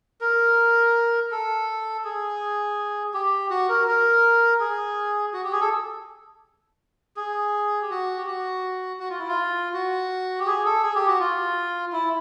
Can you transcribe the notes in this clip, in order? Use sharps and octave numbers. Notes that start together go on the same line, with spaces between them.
A#4
A4
G#4
G4
F#4
A#4
A#4
G#4
F#4
G4
G#4
A4
G#4
G4
F#4
G4
F#4
F#4
F4
E4
F4
F#4
G4
G#4
A4
G#4
G4
F#4
F4
E4